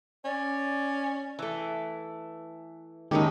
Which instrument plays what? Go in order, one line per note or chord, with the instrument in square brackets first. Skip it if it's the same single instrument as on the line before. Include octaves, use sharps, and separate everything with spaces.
[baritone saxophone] C#4 [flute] D5
[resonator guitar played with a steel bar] E3 A3
[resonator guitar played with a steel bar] A2 C#4 D#4 [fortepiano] D#3 [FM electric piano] G#3 A#3 G4